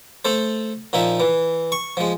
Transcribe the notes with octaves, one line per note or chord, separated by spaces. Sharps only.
A3 A4 C5
A#2 F3 D#4 E5
E3
C#6
F3 G#3